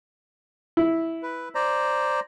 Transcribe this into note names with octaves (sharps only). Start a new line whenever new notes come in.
E4
B4
C5 D5 A#5